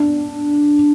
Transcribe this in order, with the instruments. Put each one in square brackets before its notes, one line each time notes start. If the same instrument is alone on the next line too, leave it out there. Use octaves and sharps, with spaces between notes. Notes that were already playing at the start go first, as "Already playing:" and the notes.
Already playing: [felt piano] D4